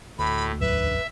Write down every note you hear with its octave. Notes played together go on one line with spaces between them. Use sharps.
D2 A2 B5
A1 E2 F#3 B4 E5